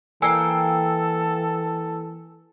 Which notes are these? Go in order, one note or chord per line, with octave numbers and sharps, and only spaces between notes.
E3 A#3 A4 F5 G5 G#5 E6